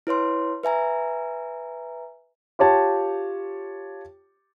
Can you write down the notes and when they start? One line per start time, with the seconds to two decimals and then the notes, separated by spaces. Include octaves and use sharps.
0.07 E4 B4 C#5 C6
0.63 B4 E5 G#5 A#5
2.59 F4 G4 C#5 A5